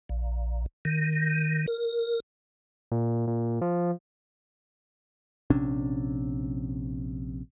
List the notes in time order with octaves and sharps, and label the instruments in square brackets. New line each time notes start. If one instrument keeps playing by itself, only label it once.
[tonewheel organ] A#1
D#3
A#4
[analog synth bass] A#2
A#2
F3
[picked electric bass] A#1 C3 C#4 D4